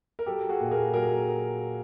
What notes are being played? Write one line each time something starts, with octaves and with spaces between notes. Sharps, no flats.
A#4
F#3 G4 A4
F#4 G#4
A#2
G#4 A#4
F#3 G#4 A#4